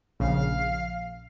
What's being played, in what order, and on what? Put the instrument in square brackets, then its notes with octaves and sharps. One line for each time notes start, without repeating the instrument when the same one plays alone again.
[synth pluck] A#1 C#3 [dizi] F5